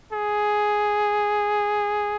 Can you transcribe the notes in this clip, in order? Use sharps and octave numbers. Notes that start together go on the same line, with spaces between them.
G#4